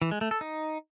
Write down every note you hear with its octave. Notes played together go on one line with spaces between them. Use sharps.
E3
G#3
A3
A4
D#4